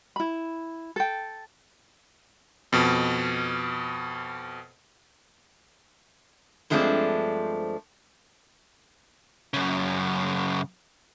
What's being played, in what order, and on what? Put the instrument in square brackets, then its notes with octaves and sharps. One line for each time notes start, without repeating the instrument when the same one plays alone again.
[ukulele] E4 B5
A4 G5
[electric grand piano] F2 B2
[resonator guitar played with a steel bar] G2 F3 G#3 A3 C4 D4
[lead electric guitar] F#2 C#3